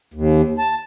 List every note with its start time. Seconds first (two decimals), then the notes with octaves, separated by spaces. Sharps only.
0.14 D#2
0.58 A5